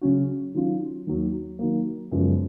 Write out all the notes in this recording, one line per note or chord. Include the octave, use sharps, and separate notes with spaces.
C#3 F#3 C#4 F#4
D#3 F#3 C#4 F4
D#2 D#3 F#3
D#3 F#3 A#3
F#2 C#3 F3 G#3 B3